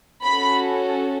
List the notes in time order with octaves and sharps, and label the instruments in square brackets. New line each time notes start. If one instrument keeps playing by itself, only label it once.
[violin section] C#4 F#4 A4 B5